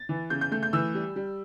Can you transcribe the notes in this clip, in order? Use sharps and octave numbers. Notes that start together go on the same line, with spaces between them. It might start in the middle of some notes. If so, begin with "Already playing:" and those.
Already playing: A6
E3
C#3 G6
G6
A3 G6
G6
E3 E6
G3
G3